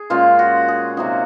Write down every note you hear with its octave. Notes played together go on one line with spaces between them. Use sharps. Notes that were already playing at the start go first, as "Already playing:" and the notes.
Already playing: G#4
A#2 G#3 C#4 F4
F#4
G#4
C3 F#3 A#3 D#4 F#4